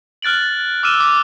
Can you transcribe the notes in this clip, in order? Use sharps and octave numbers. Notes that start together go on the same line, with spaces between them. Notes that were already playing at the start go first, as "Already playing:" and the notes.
F6 F#6 A6 D7 F#7
D6 E6 F6 D#7 E7
D6